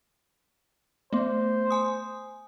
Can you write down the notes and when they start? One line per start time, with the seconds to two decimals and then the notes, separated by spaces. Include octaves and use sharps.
1.13 A3 B3 C5
1.70 G#5 D#6